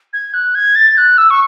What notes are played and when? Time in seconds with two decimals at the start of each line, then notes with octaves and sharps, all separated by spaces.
0.13 G#6
0.34 F#6
0.55 G#6
0.75 A6
0.97 F#6
1.18 E6
1.30 C#6